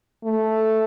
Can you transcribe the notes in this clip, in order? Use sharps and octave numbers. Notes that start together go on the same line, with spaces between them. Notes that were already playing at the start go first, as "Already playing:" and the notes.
A3